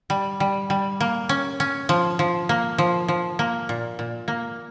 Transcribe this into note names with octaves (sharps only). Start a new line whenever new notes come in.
G3
G3
G3
A#3
C#4
C#4
F3
F3
A#3
F3
F3
A#3
A#2
A#2
A#3